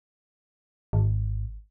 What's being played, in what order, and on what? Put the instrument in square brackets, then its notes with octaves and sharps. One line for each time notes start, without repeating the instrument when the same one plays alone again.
[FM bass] G#1